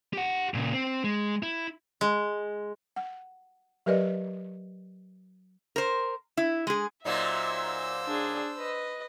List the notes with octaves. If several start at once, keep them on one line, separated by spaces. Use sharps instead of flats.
G4 F#5
A#2 C#3
C4
G#3
E4
G#3
F#5
F#3 G4 A#4 B4 D5 D#5
A#4 C5
E4
G#3 G#4
A#2 F#3 D#4 C5 E5 E6
D4 G#4
B4 D#5